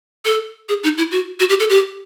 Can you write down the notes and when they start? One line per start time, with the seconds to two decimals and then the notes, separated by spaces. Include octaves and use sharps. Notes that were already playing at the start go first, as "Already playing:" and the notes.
0.25 A4
0.69 G#4
0.83 D#4
0.98 E4
1.11 F#4
1.40 F#4
1.49 G4
1.60 A4
1.69 G4